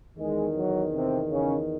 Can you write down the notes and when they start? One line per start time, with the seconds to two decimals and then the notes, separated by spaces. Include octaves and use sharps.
0.18 E2 D#3 G#3
0.55 F#3
0.93 C3 C4
1.30 C#3 C#4